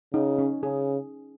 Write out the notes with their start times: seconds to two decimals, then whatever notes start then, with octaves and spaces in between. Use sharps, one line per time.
0.13 C#3 D#4
0.38 C#4
0.63 C#3 G#4